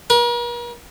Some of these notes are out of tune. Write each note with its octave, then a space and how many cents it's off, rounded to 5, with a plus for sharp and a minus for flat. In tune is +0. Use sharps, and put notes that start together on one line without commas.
A#4 +45